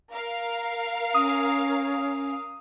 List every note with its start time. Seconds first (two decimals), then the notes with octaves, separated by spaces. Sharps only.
0.11 A#4 F5
1.14 C#4 D#6